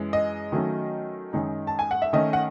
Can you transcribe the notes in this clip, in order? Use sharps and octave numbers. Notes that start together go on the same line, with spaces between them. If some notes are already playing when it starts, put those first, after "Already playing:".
Already playing: F#2 E3 G#3
D#5
D#3 F#3 A3 C#4
F#2 D#3 G#3 D#4
A5
G#5
F#5
E5
D#3 A3 C#4 D#5
F#5